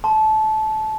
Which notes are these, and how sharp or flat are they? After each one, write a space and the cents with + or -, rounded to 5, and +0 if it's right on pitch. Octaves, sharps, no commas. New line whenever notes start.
A5 -20 C6 +0